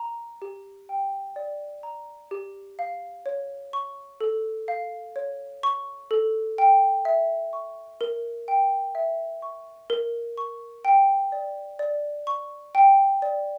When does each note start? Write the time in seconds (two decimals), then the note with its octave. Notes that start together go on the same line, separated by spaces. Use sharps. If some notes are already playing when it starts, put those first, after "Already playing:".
Already playing: A#5
0.42 G4
0.89 G5
1.36 D5
1.83 A#5
2.31 G4
2.79 F5
3.26 C#5
3.73 C#6
4.21 A4
4.68 F5
5.16 C#5
5.63 C#6
6.11 A4
6.58 G5
7.05 E5
7.53 C#6
8.01 A#4
8.48 G5
8.95 E5
9.42 C#6
9.90 A#4
10.38 C#6
10.85 G5
11.32 D5
11.79 D5
12.27 C#6
12.75 G5
13.22 D5